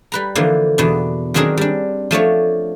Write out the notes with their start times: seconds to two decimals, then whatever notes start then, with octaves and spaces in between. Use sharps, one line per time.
0.12 G3 B4 A#5
0.35 D3 E3 F3 A#3
0.78 E2 B2 D4
1.34 D#3 F#3 C4 D4 G#4 A#4
1.57 G3 D4
2.11 F3 A3 D4 C#5